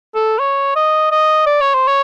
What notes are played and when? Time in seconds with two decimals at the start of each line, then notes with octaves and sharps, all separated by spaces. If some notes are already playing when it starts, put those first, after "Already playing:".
0.15 A4
0.39 C#5
0.76 D#5
1.11 D#5
1.46 D5
1.61 C#5
1.74 C5
1.87 C#5